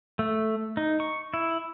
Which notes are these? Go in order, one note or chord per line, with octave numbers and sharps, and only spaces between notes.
A3
D#4
C#6
E4